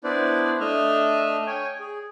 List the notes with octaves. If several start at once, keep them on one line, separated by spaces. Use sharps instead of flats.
B3 D4 E4 B4 C5 D5
A3 D4 D#5 E5 F6
C#5 G5 G#5
G#4